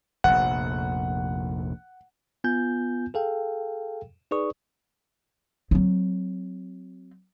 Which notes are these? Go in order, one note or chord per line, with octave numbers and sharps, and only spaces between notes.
F1 A#1 F#5
B3 F4 G#5 G6
G#4 A4 F5 G5
D#4 G#4 B4 D5 C#6 D#6
F#3 C4